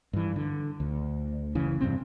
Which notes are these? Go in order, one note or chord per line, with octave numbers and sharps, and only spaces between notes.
G2 E3
D3
D2
F#1 C#3 E3
E2 G2 C3 C4